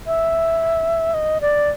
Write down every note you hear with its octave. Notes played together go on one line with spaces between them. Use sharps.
E5
D#5
D5